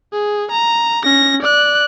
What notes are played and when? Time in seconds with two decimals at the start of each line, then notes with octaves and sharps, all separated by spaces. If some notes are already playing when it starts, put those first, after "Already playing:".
0.13 G#4
0.51 A#5
1.04 C#4 A#6
1.42 D5 F#6